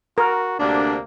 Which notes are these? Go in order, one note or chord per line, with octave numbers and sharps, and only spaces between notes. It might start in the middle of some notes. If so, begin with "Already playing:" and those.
F#4 A#4
D2 C3 A#3 D4